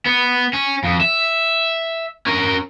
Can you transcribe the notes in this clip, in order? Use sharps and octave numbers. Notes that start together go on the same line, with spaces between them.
B3
C#4
F2
E5
C#4 A#4